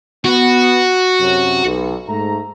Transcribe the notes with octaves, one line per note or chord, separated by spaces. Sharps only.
B3 F#4
F#2 C3 F#3
B1
G#2 A3 A#5